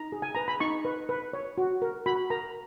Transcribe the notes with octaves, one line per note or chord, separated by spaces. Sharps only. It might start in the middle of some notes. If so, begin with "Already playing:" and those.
Already playing: D#4 A#5
G#4
G#5
B4 A#5
B5
D#4 C#6
B4
B4
C#5
F#4
A#4
F#4 B5
A#4 A#5